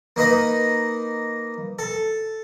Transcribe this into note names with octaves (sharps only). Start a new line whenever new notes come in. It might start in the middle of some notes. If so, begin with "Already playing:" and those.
A#3 D#4 B4 D#5
A4